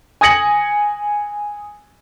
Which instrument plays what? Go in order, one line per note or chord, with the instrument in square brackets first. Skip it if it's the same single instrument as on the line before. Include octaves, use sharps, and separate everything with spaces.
[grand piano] G#5 D#6 G#6 A#6 C#7 F#7